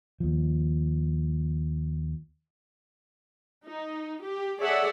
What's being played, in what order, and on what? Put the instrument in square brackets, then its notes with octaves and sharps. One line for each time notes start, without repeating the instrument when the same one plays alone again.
[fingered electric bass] D#2 F3
[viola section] D#4
G4
G#4 A4 C#5 D5 E5 F#5